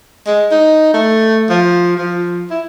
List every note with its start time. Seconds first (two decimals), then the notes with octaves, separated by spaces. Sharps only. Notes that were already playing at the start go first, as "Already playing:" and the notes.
0.27 G#3
0.51 D#4
0.94 A3
1.49 F3
1.97 F3
2.50 E4